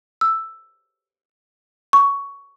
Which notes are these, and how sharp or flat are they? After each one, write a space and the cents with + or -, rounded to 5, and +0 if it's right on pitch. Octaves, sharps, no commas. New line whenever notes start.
E6 +5
C#6 +15